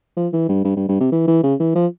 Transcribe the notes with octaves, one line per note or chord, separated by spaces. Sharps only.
F3
E3
G2
G2
G2
G2
C3
E3
E3
C#3
E3
F3